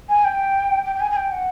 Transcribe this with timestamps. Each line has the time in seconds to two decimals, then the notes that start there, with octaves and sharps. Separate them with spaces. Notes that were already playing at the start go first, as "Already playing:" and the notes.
0.09 G#5
0.25 G5
0.86 G5
0.96 G5
1.01 G#5
1.11 G#5
1.16 G5
1.32 F#5